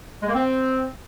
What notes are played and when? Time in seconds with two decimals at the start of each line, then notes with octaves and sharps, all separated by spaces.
0.22 G#3
0.28 A#3
0.34 C4